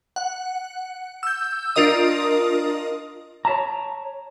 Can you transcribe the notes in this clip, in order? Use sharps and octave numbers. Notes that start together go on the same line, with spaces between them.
F#5
E6 G6
D4 F4 A#4 D#5 D#6
C#5 E5 A5 A#5